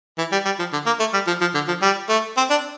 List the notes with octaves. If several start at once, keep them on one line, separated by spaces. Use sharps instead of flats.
E3
G3
G3
F3
D3
A#3
A3
G3
F3
F3
D3
F3
G3
A3
C4
D4